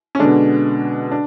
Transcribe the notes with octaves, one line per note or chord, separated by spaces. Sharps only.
C#4
B2 D3 G#3 D4
D4